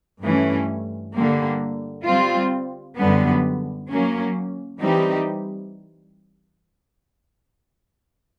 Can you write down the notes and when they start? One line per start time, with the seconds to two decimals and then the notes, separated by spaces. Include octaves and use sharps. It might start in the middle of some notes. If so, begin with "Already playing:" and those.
0.22 G2 E3 A3 C#4
1.13 D3 G3 A#3
2.05 G3 C4 F4
2.97 F#2 D3 G3 B3
3.89 F#3 A#3 C#4
4.80 E3 G3 C4 D#4 G4